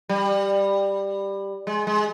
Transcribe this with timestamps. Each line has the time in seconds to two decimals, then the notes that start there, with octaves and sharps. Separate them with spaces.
0.09 G3
1.67 G#3
1.87 G#3